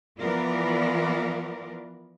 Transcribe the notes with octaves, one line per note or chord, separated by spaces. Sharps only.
E3 F3 B3 F4 A#4 D5